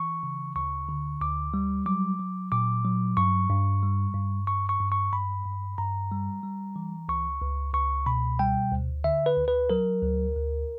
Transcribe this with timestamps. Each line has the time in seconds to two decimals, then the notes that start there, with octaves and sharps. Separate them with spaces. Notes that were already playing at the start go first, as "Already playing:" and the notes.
Already playing: E3 C#6
0.23 C#3
0.56 D2 C#6
0.89 D3
1.21 D2 D6
1.54 G3
1.86 F#3 D6
2.19 F#3
2.52 A#2 D6
2.85 F#3
3.17 G2 C#6
3.50 G2
3.83 G3
4.14 G2
4.47 G2 C#6
4.69 C#6
4.80 G2
4.92 C#6
5.13 G2 B5
5.46 G2
5.78 G2 A#5
6.11 G3
6.43 G3
6.76 E3
7.09 C#2 C#6
7.41 C#2
7.74 C#2 C#6
8.06 B2 B5
8.39 G3 G5
8.72 D2
9.04 D3 E5
9.26 B4
9.38 D2
9.48 B4
9.70 F#3 A#4
10.03 D2
10.36 D2